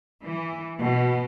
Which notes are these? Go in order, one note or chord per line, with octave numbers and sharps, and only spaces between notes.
E3
B2